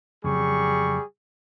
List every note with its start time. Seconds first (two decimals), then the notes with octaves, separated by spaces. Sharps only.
0.24 F2 C#3 F#3 G3 G#4 C#6